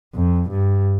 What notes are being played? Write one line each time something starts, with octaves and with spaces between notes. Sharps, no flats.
F2
G2